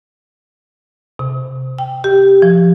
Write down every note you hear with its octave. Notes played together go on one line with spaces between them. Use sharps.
C3
G5
G4
F3